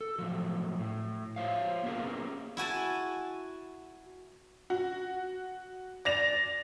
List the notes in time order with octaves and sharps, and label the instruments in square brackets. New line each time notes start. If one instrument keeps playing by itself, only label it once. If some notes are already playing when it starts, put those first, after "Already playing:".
[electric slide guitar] A4
A2 F3 F#3
A2
F4 C5 C#5 F5
A#3 B3 C#4 G4 G#4 A#4
[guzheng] E4 F#4 G#5 A5
[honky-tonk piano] F#4
D5 A#6 F7